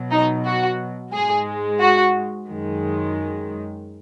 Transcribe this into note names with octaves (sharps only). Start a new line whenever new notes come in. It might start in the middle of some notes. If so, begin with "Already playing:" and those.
Already playing: B2 F#3
D#4
F#4
G#2 G#3 G#4
F#4
F#2 D#3 G#3